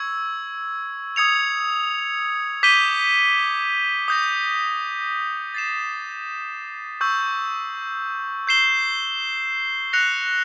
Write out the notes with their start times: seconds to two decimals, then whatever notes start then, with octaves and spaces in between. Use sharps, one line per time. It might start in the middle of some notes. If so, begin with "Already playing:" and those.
Already playing: C#6 E6 G#6
1.16 D#6 G#6 C#7 F7
2.63 D6 G6 B6 D#7 G7
4.08 D#6 G6 A#6
5.54 A6 C7 E7
7.01 C#6 E6 G6
8.47 G6 C7 E7 G7
9.93 F#6 A#6 C#7 F7